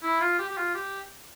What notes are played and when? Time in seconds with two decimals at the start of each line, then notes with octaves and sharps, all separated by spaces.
0.03 E4
0.20 F4
0.39 G4
0.49 G4
0.57 F4
0.75 G4